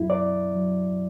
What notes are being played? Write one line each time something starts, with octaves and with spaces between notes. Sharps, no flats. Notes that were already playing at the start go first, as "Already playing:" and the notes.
Already playing: F#2 F#3 E4
D5
F#3